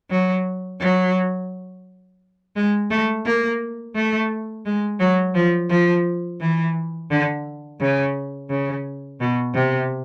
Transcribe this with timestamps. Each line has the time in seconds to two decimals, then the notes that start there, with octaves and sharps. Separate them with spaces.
0.10 F#3
0.80 F#3
2.56 G#3
2.91 A3
3.26 A#3
3.95 A3
4.66 G#3
5.00 F#3
5.35 F3
5.70 F3
6.41 E3
7.11 D3
7.80 C#3
8.50 C#3
9.20 B2
9.54 C3